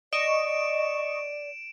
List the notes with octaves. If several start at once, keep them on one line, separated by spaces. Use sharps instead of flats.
D5 D#5 C#6 D7 E7